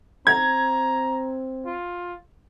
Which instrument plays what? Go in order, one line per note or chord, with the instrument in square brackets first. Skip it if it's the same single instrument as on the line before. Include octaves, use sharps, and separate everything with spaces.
[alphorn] C4 [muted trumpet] A#5 [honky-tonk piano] G#6
[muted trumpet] F4